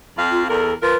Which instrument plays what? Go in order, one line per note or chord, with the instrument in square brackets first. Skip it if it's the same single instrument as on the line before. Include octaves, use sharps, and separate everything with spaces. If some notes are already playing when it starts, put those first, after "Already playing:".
[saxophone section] F2 F5
[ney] F4
[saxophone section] E2 A#4 [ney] A4
[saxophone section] F3 F4 A#4 [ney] B4